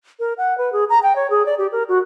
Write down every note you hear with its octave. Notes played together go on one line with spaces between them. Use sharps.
A#4
F#5
B4
G#4
A#5
G5
C#5
G#4
D5
G4
A#4
F#4